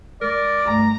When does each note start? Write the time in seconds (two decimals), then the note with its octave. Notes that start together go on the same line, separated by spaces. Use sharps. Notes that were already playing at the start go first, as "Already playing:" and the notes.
0.21 G#3 A#4 D5
0.66 G2 A3 A#5